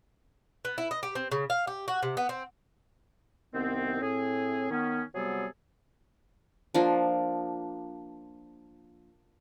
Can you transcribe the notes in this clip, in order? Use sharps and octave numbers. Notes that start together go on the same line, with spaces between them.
B3
E4
D#5
G4
C4
C#3
F5
G4
F#4
C3
B3
C4
C2 D#3 B3 C4
A2 C4 G#4
D#3 B3 C#4
C3 F#3 G3 B3 G#4 A4
F3 A#3 D4